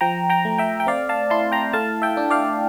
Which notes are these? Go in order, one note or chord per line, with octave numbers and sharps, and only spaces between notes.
F3 G5 A#5
G5 A#5
A3
E5 G5
G5
C4 D5 F5
F5 A5
E4 A5 C6
G5 A#5
A3 F5 A5
E5 G5
D4
D5 F5